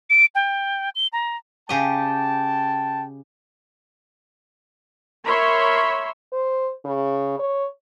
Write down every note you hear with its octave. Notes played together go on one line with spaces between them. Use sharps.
D7
G5
G7
A#5
C#3 G4 D#5 G5 A5
A#4 C#5 E5 B5 C6
C5
C#3
C#5